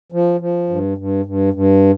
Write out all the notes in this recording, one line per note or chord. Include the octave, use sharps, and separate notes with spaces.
F3
F3
G2
G2
G2
G2